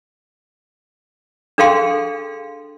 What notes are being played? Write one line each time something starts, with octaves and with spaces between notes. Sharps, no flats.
D4 G#4 A4 F5 G5 C6